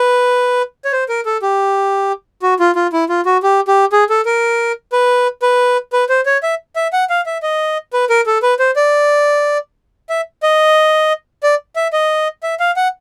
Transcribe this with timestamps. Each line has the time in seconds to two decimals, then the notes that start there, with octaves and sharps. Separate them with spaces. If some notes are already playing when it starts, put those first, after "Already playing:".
Already playing: B4
0.85 C#5
0.92 C5
1.09 A#4
1.26 A4
1.42 G4
2.42 F#4
2.59 F4
2.76 F4
2.93 E4
3.09 F4
3.26 F#4
3.43 G4
3.68 G4
3.92 G#4
4.10 A4
4.25 A#4
4.92 B4
5.42 B4
5.93 B4
6.09 C5
6.26 C#5
6.43 E5
6.76 E5
6.93 F#5
7.10 F5
7.26 E5
7.43 D#5
7.93 B4
8.10 A#4
8.27 A4
8.43 B4
8.59 C5
8.76 D5
10.09 E5
10.43 D#5
11.43 D5
11.76 E5
11.93 D#5
12.43 E5
12.60 F5
12.76 F#5